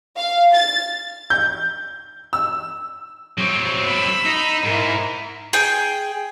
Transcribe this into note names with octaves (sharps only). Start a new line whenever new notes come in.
F5
A6
G6
E6
F#3 C4
B5 E6
D#4
G#2 E4 A#4
G#4 G5